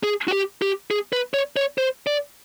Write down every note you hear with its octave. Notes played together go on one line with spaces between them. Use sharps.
G#4
F#4
G4
G4
G#4
B4
C#5
C#5
C5
D5